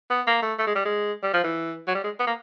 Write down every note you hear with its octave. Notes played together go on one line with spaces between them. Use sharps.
B3
A#3
A3
A3
G#3
G3
G#3
G3
F3
E3
F#3
G3
G#3
B3
A#3